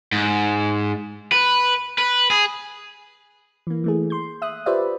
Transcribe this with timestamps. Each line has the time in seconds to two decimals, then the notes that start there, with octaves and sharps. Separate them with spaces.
0.12 G#2
1.32 B4
1.98 B4
2.30 G#4
3.67 E3 A#3
3.84 E3 A3 G#4
4.10 C6 G6
4.42 E5 D#6 F#6
4.66 F4 G4 B4 C5 D5 E5